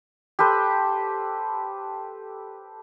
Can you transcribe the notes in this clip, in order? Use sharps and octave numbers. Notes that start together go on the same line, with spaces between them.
G4 A4 B4 C5